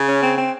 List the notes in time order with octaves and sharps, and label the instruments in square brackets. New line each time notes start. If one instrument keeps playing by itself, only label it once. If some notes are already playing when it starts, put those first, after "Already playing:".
Already playing: [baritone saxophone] C#3
[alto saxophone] C#4
C4
C4